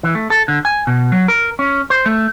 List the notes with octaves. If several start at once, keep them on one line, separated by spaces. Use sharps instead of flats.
E3
A3
A4
D3
G#5
B2
F#3
A#4
C#4
C5
A3